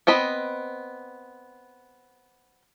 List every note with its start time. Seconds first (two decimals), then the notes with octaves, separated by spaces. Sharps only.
0.07 B3 C4 D#5 B5